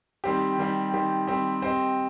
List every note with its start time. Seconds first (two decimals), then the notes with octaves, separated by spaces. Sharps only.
0.24 D#3 G3 C4 G4
0.58 D#3 G3 C4 G4
0.94 D#3 G3 C4 G4
1.27 D#3 G3 C4 G4
1.62 C4 G4 C5 D#5